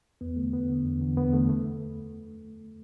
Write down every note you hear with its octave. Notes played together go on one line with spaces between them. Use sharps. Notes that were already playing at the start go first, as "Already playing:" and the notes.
E2 B3
D3 A3
E2 B3
D3
E2
D3
E2 B3
D3 A3
A3